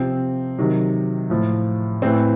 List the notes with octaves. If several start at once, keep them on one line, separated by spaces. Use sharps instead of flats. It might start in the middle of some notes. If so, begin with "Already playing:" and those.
Already playing: C3 F3 C4
C3 D#3 F#3
A2 F3
A2 E3 C4